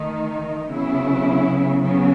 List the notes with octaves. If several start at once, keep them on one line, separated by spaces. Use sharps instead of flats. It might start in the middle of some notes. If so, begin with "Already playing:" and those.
Already playing: D#3 A3 D#4
C#3 F#3 B3 E4
C#3 F#3 B3